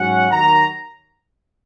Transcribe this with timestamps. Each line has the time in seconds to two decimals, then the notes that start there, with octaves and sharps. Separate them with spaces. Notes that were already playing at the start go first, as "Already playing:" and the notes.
Already playing: G#2 F#3 C#4 F#5
0.30 D#2 D#3 F#3 A#5